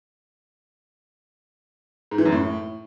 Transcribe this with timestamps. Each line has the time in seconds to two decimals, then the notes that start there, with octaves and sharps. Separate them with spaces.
2.11 G#2
2.18 E3
2.25 F#2
2.32 A2